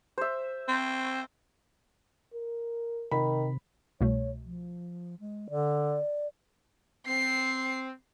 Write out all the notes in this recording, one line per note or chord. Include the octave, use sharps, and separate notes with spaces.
C5 E5
C4
A#4
C3 D#3 B5
C2 B2 A3 C#5
F3
G#3
D3 D5
C4 C7